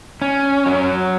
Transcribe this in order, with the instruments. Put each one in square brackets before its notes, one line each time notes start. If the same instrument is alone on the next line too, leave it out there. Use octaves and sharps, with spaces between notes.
[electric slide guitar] C#4
F#3